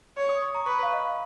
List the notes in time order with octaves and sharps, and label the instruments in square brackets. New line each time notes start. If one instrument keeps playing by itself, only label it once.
[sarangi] C#5
[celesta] D#6
C#6
A#5
[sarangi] B4 [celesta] C#6
[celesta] F5
D#5
F5